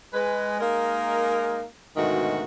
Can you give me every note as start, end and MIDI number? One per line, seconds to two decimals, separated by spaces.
0.14 0.57 56
0.14 0.57 71
0.60 1.64 56
0.60 1.64 58
0.60 1.64 63
0.60 1.64 70
1.97 2.44 38
1.97 2.44 44
1.97 2.44 47
1.97 2.44 51
1.97 2.44 57
1.97 2.44 66